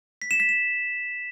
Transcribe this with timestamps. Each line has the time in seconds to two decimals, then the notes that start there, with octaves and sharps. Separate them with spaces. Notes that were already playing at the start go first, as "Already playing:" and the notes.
0.22 B6
0.31 E7
0.40 B6
0.49 E7